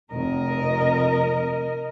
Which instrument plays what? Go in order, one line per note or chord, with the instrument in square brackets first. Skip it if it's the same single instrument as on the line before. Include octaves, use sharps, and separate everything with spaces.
[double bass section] F1 [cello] A#4 D#5